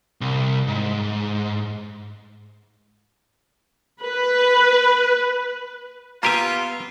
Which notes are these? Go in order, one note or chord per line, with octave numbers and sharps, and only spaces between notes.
C2
G#2
B4
A#3 B3 F4 G4 G#5 A#5 E6